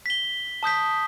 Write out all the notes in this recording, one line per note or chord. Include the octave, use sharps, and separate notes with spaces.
B6 G7
A5 D#6 G6 B6